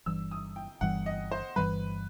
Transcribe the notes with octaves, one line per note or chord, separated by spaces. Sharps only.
G1 G2 E3 G3 E6
D#6
G5
G1 G2 E3 G3 F#5
D#5
C5
G1 G2 E3 G3 B4